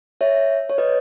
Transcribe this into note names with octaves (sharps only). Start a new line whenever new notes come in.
C#5 E5
C#5
B4 D#5